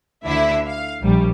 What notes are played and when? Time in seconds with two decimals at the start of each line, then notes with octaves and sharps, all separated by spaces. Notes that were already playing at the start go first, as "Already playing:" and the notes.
0.25 D2 D3 E4 E5
0.68 F5
1.01 A#1 G3